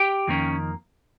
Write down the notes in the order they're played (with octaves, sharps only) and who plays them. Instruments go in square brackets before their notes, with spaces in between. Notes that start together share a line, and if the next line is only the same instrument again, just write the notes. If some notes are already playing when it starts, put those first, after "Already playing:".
Already playing: [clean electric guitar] G4 G5
F2 D#3 A#3 C#4